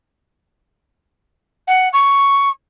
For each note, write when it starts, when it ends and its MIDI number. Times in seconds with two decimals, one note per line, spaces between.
1.67 1.88 78
1.93 2.49 85